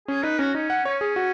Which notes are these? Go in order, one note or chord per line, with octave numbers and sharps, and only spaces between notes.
C#4 G#4
D#4 B4
C#4 F#4
C#4 D#4
F#5
C#4 C#5
G#4
F#4